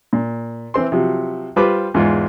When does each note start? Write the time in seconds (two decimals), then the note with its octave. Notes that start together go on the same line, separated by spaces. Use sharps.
0.13 A#2
0.74 E3 C4 C6
0.92 C3 F3 F#3
1.56 G3 F4 B4 C5 D6
1.94 E2 G#2 F4